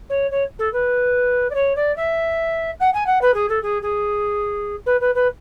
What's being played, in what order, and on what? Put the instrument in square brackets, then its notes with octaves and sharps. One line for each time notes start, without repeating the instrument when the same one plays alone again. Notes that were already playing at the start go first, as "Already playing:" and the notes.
[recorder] C#5
C#5
A4
B4
D5
C#5
D5
E5
F#5
G#5
F#5
B4
G#4
A4
G#4
G#4
B4
B4
B4